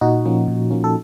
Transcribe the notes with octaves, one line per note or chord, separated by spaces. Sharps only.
A#2 D#4 F#4
F3 A#3 C#4
A#2
F3 A#3 C#4
A4